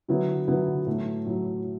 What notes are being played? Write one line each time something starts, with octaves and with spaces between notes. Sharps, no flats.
D3 F#3 B3 E4
D3 F#3 B3 E4
A2 F#3 A3
A2 F#3